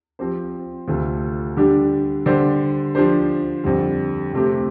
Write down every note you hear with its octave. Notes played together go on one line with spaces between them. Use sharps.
F3 C4 G4 C5
D2 C3 A3 F4 A4
D3 G3 D4 G4
D3 G3 D4 G4 C5
F3 D4 G4 C5
F2 D3 G3
F2 C3 A3 C4 G4